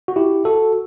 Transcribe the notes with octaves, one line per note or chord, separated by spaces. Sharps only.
F#4
E4 G4
F#4 A4